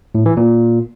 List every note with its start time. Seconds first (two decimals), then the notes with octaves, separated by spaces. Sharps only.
0.15 A2
0.26 E3
0.37 A#2